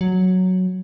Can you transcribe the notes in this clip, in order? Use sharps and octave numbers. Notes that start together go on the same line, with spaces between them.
F#3